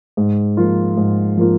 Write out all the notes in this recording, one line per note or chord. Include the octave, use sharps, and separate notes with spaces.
G#2
F3 A#3 F4
G#2
F3 A#3 F4